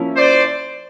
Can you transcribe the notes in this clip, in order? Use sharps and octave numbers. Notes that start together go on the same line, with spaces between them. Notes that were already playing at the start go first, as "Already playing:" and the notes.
Already playing: F3 A#3 C#4 E4
C5 D5